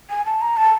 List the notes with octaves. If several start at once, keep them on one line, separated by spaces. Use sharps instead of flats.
G#5
A5
A#5
A5